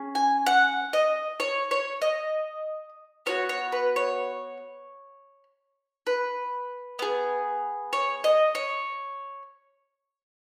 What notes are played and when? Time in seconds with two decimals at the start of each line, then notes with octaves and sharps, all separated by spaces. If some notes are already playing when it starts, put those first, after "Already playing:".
Already playing: C#4 G#4
0.15 G#5
0.46 F#5
0.93 D#5
1.40 C#5
1.71 C#5
2.02 D#5
3.26 B3 F#4 C#5
3.49 C#5
3.72 B4
3.96 C#5
6.07 B4
6.99 B3 G#4
7.93 C#5
8.24 D#5
8.55 C#5